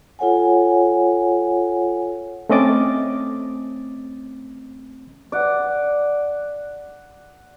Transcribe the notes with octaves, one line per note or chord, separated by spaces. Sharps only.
F4 A4 C#5 F#5 G#5
A3 C4 C#4 D#5 D6 A6
D5 F#5